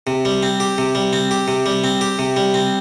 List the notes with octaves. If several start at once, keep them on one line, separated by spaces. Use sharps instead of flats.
C3
G3
C4
G4
C3
G3
C4
G4
C3
G3
C4
G4
C3
G3
C4